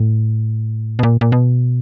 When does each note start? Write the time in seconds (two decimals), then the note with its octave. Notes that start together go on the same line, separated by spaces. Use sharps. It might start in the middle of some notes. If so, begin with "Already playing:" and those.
Already playing: A2
0.99 B2
1.03 A#2
1.21 A#2
1.32 B2